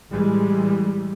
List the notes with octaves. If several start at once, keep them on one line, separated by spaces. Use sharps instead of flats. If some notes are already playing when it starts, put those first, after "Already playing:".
A2 E3 G3 G#3